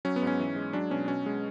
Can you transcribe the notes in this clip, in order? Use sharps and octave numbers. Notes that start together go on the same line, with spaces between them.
F#3 C#4
B3
G#2
C#4
E3
G#3
F#3 D4
B2 C#4
B2 C#4
G#3